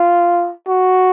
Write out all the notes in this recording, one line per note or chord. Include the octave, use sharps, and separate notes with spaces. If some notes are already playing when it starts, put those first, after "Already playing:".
Already playing: F4
F#4